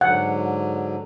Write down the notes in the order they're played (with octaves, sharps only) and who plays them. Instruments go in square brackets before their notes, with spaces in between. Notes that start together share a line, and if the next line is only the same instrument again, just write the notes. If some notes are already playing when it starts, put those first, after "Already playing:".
[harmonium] G#2 D3 F#3 [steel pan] F#5